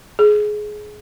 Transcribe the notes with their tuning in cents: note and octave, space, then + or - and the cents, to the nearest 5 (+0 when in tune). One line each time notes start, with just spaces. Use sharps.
G#4 +15